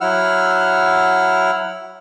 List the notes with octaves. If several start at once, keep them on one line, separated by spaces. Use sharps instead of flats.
F#3 E4 F#5 E6 F6